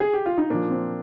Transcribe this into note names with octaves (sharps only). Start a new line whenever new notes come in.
G#4
G4
F4
D#4
A#2 F3 A#3 D4
C4